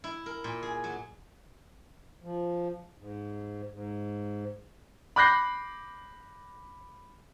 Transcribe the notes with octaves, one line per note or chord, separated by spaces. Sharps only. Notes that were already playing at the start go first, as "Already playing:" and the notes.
E4
A#4
A#2
G#4
F#3
F3
G#2
G#2
B5 D6 F#6 G6 A#6 C7